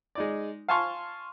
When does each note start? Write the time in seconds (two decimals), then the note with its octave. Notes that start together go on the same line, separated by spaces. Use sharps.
0.15 G#3 D#4 D5
0.68 F5 G#5 A5 C6 C#6 F6